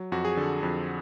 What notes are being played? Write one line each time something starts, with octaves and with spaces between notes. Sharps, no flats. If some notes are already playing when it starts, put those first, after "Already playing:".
Already playing: F#3
F2 F#4
G#4
D3 A4
F2